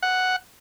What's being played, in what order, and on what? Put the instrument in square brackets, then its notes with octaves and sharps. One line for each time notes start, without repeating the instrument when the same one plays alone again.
[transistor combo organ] F#5